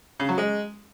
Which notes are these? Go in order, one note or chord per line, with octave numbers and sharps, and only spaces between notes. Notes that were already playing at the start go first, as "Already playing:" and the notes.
C#3
F#3
G#3